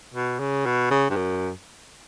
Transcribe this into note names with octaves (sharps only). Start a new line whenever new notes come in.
B2
C#3
B2
C#3
G2
F#2